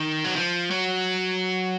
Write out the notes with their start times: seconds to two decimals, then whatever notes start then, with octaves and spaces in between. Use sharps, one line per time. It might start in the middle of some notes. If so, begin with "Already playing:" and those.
Already playing: D#3
0.25 F#3
0.36 F3
0.71 F#3